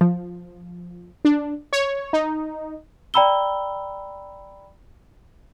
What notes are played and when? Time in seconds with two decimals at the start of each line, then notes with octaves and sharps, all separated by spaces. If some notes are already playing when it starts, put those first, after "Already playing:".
0.01 F3
1.25 D4
1.73 C#5
2.13 D#4
3.14 D5 G5 A#5 B5 E6 G7